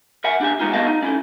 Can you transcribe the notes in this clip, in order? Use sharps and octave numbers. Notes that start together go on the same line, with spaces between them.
A#4 E5 F#5 G#5
D4 G4 G#5
G#3 A3 B3 D#4 F4
B3 F#4 A#4 D#5 F5 A5
D#4
C#4 E4 A4